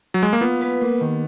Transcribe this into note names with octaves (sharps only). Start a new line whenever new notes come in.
F#3
G#3
A#3
B3 F4
B4
A#3
D#3